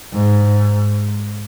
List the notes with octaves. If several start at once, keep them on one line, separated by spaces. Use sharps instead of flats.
G#2